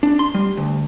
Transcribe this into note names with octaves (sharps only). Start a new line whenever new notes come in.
D4
C6
G3
D2